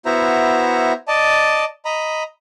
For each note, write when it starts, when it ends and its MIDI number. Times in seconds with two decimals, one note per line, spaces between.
0.05 0.93 59
0.05 0.93 64
0.05 0.93 66
0.05 0.93 72
0.05 0.93 76
0.05 0.93 82
1.08 1.65 74
1.08 1.65 75
1.08 1.65 81
1.85 2.23 75
1.85 2.23 82
1.85 2.23 83